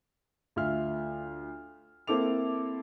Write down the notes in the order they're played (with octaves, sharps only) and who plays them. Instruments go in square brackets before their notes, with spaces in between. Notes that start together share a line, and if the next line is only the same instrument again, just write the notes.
[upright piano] D2 F4 E5 F6
A#3 C4 E4 A4 D6 F7